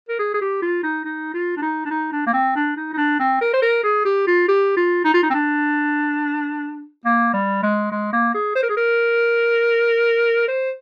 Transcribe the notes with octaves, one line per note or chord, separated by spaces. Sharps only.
A#4
G#4
G#4
G4
F4
D#4
D#4
F4
D4
D#4
D4
D#4
D4
A#3
C4
D4
D#4
D#4
D4
C4
A#4
C5
A#4
G#4
G4
F4
G4
F4
D#4
F4
D#4
C4
D4
A#3
G3
G#3
G#3
A#3
G#4
C5
A#4
G#4
A#4
C5